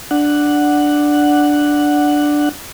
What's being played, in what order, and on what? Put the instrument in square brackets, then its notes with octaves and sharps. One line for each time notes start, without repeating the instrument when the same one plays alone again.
[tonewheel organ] D4 F#5